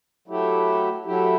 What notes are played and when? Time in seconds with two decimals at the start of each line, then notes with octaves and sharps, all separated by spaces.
0.28 F#3 A3 E4 G4
1.05 F#3 A3 E4 G4